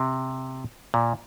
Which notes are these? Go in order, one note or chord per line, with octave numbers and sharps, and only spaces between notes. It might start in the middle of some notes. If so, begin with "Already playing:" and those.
Already playing: C3
A#2